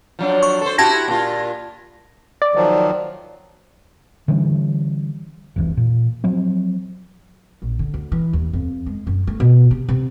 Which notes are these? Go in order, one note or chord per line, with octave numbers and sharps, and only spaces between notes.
F3 F#3 D4
C#6
A4 C5
E4 F#4 G4 A5 G#6 A#6
A#2 F4
D5
D#3 F3 F#3
D3 E3 G3 C#4
F1 C2 E3
A#2
F3 F#3 C4
A#1
D3
D2
E3
D#2
F2
G#3
F#2
A3
B2
C3
C3